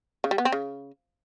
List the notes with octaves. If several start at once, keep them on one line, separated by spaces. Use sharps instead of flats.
C#3
G3
B3
C4
C#3